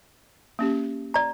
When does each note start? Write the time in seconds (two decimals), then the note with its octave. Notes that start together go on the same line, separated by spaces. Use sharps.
0.59 A#3 C#4 G4
1.14 D5 A#5